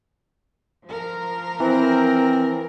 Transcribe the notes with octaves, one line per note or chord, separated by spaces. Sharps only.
F3 A#4
E3 C4